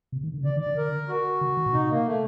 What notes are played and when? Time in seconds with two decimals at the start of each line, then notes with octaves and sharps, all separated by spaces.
0.12 C3
0.23 D#3
0.34 D3
0.41 C3
0.45 D3 D5
0.56 D#3
0.60 D5
0.66 D3
0.77 A#4
1.09 F#4
1.41 D3
1.57 D#3
1.66 A#2
1.73 C3 D#4
1.90 A#3
2.06 A3